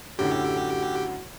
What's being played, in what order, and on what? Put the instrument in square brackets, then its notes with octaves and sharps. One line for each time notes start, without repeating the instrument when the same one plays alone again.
[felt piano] F#2 A2 D3 [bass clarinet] F#4 [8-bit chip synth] G4